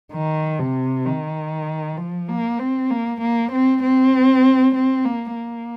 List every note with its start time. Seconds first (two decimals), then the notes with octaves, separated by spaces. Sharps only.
0.13 D#3
0.59 C3
1.05 D#3
1.97 F3
2.29 A#3
2.59 C4
2.90 A#3
3.21 A#3
3.52 C4
3.82 C4
4.75 C4
5.05 A#3
5.36 A#3